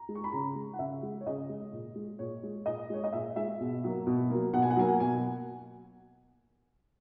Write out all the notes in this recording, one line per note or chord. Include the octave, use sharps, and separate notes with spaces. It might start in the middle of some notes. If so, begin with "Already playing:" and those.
Already playing: A#5
G#3
C#6
B5
C#3 A#5
G#3
F#5
C#3 E5
G#3
C#5
C#3 D#5
G#3
A#2
G#3
A#2 C#5
G#3
A#2 D#5
G#3 C#5
D#5
A#2 E5
G#3 E5
B2
F#3 A#3
B2
F#3 A#3
B2 F#5
G#5
F#5
F#3 A#3 G#5
F#5
B2 G#5